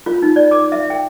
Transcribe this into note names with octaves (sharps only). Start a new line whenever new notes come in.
F4
D#4
D5
D6
E5
G5